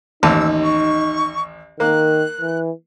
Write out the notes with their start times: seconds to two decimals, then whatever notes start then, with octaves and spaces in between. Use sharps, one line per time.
0.23 A1 D#2 D#4 A5 E6
0.63 C#6
1.80 D#3 A#3 F#6
2.41 E3